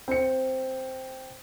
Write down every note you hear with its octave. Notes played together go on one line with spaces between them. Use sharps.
C4 C#7